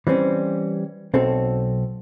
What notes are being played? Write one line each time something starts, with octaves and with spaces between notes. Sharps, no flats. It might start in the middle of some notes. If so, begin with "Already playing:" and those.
E3 G3 C4 C#4
B1 C4 F#4 A4